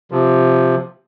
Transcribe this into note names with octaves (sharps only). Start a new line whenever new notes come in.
C3 F3